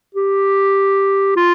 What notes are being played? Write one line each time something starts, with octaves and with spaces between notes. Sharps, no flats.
G4
F4